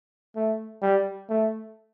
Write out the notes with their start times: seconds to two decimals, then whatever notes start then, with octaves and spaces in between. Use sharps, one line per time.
0.36 A3
0.82 G3
1.29 A3